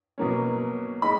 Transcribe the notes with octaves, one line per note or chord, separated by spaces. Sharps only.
B2 F#3 A#3 C#4
G#3 D#4 B5